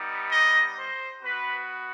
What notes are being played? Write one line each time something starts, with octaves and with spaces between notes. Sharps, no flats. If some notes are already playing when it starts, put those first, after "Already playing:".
Already playing: G3 B3 D#4
D#5
C5
B3 F#4 B4